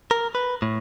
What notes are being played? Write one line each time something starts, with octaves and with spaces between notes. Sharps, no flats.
A#4
B4
A2